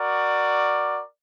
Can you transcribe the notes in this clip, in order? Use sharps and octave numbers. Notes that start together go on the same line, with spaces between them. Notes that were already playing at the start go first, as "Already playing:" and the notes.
Already playing: F#4 A#4 D5